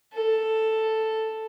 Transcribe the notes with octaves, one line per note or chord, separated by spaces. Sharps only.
A4